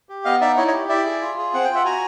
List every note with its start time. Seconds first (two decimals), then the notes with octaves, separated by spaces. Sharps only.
0.09 G4
0.25 B3 D#5 F5
0.41 D#4 D5 E5
0.57 E4 C#5 D#5
0.68 C#5 D#5
0.73 G4
0.89 E4 D5 E5
1.05 G#4
1.21 F4
1.38 G#4
1.54 C4 F#5
1.64 F4 G5
1.75 E5 F#5
1.85 F#4 G#5 A#5